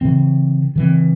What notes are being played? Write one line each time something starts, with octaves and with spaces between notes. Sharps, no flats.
C#3 E3 C4
C#3 E3 C4